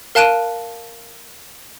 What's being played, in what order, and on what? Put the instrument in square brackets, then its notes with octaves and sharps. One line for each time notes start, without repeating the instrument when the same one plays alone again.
[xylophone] A#4 F5 A5 F#6 D7 D#7